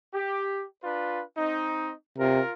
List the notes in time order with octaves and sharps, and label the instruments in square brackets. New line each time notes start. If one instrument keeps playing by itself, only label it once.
[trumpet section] G4
D4 F4 B4
C4 D#4
[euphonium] C3 [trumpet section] F4 A#4